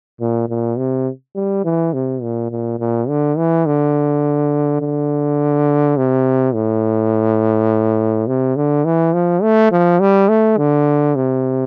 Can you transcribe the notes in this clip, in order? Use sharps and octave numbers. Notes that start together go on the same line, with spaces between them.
A#2
A#2
C3
G3
E3
C3
A#2
A#2
A#2
D3
E3
D3
D3
C3
A2
C3
D3
E3
F3
A3
F3
G3
A3
D3
C3